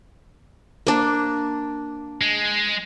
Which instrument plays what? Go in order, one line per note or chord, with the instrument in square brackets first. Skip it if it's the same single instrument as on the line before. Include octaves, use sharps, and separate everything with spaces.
[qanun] A#3 D4
[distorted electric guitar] G#3